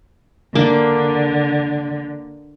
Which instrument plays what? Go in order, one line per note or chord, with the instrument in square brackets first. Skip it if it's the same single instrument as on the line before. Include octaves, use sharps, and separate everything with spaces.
[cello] D3 [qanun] A#3 D4 F5